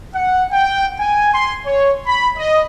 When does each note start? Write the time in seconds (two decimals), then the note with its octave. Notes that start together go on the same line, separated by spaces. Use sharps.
0.14 F#5
0.52 G5
0.99 G#5
1.34 C6
1.67 C#5
2.07 B5
2.37 D#5